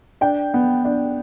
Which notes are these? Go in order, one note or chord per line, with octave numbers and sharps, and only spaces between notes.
D4 G5
B3
D4